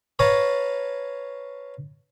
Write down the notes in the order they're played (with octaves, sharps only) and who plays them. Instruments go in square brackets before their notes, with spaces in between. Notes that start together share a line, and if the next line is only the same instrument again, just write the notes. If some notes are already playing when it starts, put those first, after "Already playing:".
[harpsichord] B4 C#5 F5 A5 A#5